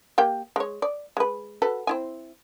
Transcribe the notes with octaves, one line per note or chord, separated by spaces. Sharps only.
A#3 G4 G5
G#3 C#5
D5
G#3 B4
F#4 A4 B4
C4 E4 G#5